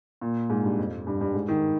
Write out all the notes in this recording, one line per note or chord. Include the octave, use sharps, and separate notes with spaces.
A#2
G#2
G2
F2
G2
G2
G#2
D#3